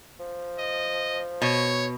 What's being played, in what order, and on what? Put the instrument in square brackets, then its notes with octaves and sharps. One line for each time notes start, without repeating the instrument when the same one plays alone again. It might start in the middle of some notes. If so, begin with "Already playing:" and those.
[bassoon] F3
[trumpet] D#5
[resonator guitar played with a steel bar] B2 [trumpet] C#5